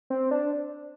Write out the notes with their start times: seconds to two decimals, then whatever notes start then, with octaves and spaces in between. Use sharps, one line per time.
0.10 C4
0.31 D4